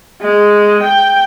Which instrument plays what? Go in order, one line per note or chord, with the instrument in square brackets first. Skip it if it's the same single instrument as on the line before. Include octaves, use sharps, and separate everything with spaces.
[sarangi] G#3
G5